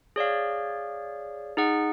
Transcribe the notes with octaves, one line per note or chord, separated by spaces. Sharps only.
G#4 C#5 D5 F5
D#4 G#4 F#5